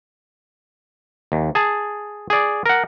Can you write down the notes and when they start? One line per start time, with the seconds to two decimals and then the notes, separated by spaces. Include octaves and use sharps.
1.32 D#2
1.55 G#4 A5
2.30 G#4 D5
2.66 A#4 F#5